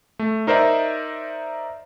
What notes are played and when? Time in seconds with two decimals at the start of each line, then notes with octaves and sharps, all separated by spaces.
0.19 A3
0.47 D#4 A#4 C5 D5 E5